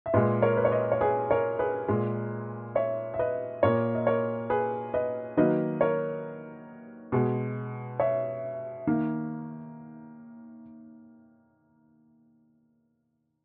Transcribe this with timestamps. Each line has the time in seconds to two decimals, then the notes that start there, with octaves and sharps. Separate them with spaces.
0.06 E5
0.13 A#2 G#3 B4 D#5
0.42 A#4 C#5
0.57 B4
0.65 C#5
0.71 B4 D#5
0.92 C#5
1.01 G#4 B4
1.31 A#4 C#5
1.59 G#4 B4
1.88 A#2 G#3
2.75 C#5 E5
3.14 E5
3.19 B4 D#5
3.63 A#2 A#3 A#4 C#5
3.95 D#5
4.07 A#4 C#5
4.50 G#4 B4
4.94 B4 D#5
5.37 D#3 F#3 A#3 B4 D#5
5.81 A#4 C#5
7.12 B2 G#3
8.00 C#5 E5
8.87 D#3 A#3